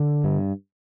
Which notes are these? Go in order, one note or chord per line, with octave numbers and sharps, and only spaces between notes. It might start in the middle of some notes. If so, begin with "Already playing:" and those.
Already playing: D3
G2